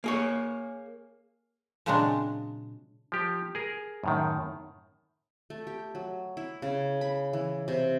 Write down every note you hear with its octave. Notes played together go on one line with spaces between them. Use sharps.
A#3 G#4 C#5
A#2 C#3 F#3 G#3 C4 D4
F3 G4
G#4 A#4
F#2 A2 D#3
A3
G4
F#3
E4
C#3
B5
E3
C3